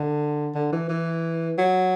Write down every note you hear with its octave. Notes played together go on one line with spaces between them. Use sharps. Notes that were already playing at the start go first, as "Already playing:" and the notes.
Already playing: D3
D3
E3
E3
F#3